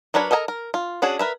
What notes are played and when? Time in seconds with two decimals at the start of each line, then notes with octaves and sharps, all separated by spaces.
0.14 F#3 D4 A#4 B4 C#5
0.31 A4 A#4 D#5 G#5 A#5
0.48 A#4
0.74 F4
1.02 C#4 D4 F#4 G#4
1.19 A#4 B4 E5